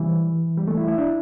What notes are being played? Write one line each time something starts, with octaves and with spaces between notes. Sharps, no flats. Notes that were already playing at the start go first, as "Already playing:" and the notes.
Already playing: E3 G3
G3
A3
E4
E4
D4